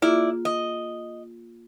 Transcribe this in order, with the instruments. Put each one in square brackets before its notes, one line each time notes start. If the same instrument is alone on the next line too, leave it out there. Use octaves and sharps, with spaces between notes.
[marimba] A#3 F4 G#4 [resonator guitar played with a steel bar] E4 D5
[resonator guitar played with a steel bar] D#5